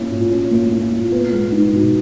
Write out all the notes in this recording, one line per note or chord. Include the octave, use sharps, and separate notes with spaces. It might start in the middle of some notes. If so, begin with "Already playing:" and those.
Already playing: A#3 C#4 E4
A#2
C#4
A#3
E4
A#2
B3
G#3
D#4
B2